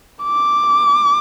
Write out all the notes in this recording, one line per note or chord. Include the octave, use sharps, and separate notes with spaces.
D6